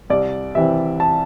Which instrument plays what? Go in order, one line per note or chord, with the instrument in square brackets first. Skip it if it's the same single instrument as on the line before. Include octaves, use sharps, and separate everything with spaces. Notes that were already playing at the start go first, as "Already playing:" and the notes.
[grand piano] C2 D5
C3 E3 C4 E5
A5